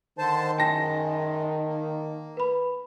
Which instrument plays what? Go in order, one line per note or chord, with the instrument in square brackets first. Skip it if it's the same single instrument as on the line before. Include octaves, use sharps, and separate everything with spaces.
[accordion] D3 C5 A5 [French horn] D#3
[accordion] F#2 G#3 [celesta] G5 [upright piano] A5 A#6
[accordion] A#3
[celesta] B4 B5